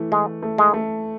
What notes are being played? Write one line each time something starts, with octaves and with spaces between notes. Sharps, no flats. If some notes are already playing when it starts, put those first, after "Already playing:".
Already playing: E3 A3
E3 G#3
A3
G#3
A3